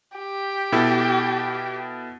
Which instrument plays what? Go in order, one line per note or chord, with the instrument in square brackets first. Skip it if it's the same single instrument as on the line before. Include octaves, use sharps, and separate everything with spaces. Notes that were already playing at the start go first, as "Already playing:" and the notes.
[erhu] G4
[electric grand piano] B2 E4 A4